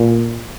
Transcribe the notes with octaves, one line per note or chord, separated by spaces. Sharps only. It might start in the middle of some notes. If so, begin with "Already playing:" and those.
Already playing: A#2